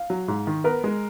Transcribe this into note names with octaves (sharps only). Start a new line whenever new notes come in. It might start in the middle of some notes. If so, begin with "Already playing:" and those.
Already playing: F5
F#3
G#2
D#3
B3 A#4
G#3